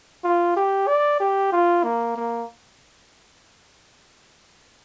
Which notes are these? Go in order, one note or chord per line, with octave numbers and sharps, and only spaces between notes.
F4
G4
D5
G4
F4
A#3
A#3